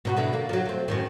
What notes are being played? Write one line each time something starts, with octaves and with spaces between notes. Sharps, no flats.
B2 D#4 F#4
B2 D3 E4
D3 A#3
F3 F#3
A3 C4
F#2 A2 D#3